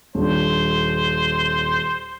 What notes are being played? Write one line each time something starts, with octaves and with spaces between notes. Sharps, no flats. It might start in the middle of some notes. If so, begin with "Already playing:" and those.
D#1 D4 C5